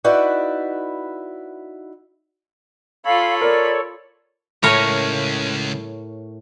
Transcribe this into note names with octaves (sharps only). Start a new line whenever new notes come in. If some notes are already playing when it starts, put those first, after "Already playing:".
D#4 E4 F#4 B4 D5 E5
F4 A4 C#5 F5 B5
A#4 D5
C#2 A2 C#4 A#4 C#5